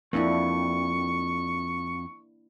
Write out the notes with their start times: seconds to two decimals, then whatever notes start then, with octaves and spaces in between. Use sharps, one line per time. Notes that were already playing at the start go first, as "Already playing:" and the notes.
0.13 F2 A#3 D4 E4 C#6